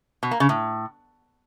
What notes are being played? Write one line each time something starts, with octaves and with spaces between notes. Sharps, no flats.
B2
A#3
C#3
A2